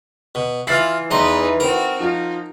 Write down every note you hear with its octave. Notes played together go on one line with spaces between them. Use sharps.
B2
E3 E4 F4 F6 A6 C7
E2 D#4 B4 D#5 A#5 C6
C4 F#4 A#4
F3 D#4 F4